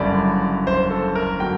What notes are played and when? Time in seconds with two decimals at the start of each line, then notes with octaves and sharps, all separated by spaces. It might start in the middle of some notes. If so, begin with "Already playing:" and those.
Already playing: F#1 F#2 D3 G3 D5
0.67 C5
0.90 A4
1.15 A#4
1.40 D3 F#3 A#3 G5